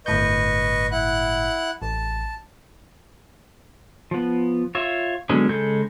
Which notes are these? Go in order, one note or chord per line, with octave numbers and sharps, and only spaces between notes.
G1 A2 B4 D#5 C#6 G6
E4 F#5 F#6
A1 A5
F3 B3
F4 C#5 E5
D3 F#3 G#3 B3 C#4
C#3 G#3 A4 G6